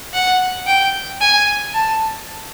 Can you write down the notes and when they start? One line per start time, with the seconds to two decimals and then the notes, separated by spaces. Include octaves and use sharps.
0.14 F#5
0.67 G5
1.21 G#5
1.74 A5